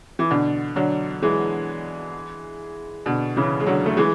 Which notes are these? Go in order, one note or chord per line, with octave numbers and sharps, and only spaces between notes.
E3
B2 D3
D3 F#3
E3 G#3
B2 D3
C#3 E3
G#3
D3 F#3
A3
E3 G#3